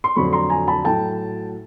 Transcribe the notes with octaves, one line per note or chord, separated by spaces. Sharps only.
C6
F2 D3 F#3 A3 B5 C#6
A#5 C6
G#5 A#5
A5 B5
A2 F#3 A3 G5 A5